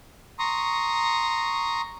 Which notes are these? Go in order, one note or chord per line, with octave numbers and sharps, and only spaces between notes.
A#5 C6 C#6 D#6